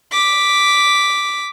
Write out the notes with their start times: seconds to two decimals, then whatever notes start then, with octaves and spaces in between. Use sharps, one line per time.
0.13 D6 B6